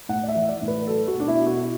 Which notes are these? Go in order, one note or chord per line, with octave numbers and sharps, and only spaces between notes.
A2 F#5
D5
E5
E3
D5
A2
B4
F#3 A4
F#4
B2
D4
E4
B2
F#4